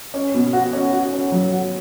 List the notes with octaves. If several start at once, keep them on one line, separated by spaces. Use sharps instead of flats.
C#4
B2
F#4
C#4
F#4
C#4
F#3
F#4